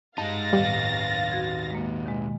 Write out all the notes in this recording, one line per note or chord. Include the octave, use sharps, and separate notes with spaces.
G2 G#3 D#4 F5 A5 A6 A#6
D#2 A2 D#3 G3 B3 G4
F#4 G#6
G#3 A#3
B2 D#3 G#3